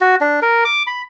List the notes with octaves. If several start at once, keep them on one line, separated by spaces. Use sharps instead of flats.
F#4
D4
A#4
D6
B5